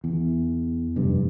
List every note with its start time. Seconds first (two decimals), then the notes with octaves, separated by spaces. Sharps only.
0.04 E2
0.96 F1 G2